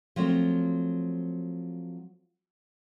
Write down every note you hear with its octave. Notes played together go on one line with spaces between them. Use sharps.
F3 F#3 A3 C4